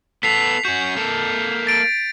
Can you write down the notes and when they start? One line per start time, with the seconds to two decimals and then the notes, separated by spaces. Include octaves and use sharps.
0.23 B3 A4 B6 C7 F7
0.65 C#4 F#4 G6
0.96 A#3 A4
1.67 A6 D7